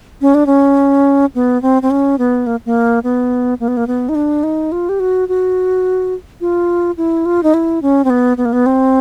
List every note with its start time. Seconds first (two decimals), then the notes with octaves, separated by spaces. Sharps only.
0.21 C#4
0.34 D4
0.46 C#4
1.35 B3
1.62 C4
1.82 C4
1.90 C#4
2.18 B3
2.47 A#3
2.66 A#3
3.04 B3
3.60 A#3
3.68 B3
3.77 A#3
3.87 B3
4.09 D#4
4.15 D4
4.43 D#4
4.72 F4
4.89 G4
5.00 F#4
5.29 F#4
6.41 F4
6.97 E4
7.26 F4
7.43 D#4
7.54 E4
7.82 C#4
8.04 C4
8.10 B3
8.37 B3
8.45 A#3
8.53 B3
8.66 C4